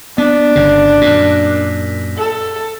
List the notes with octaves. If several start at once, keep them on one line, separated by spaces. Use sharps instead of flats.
B3 D4
G1 C#3
F#2 A#2
A4